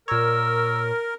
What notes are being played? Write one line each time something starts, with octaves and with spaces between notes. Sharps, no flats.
A#2 A#4 C#5 E6